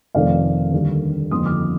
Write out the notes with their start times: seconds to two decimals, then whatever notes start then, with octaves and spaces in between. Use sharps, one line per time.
0.14 F1 F2 D#3 A3 C4 D5 F5
0.72 D#2 D3 G3
1.31 G1 F2 D#3 A#3 C6 D#6
1.45 D6 F6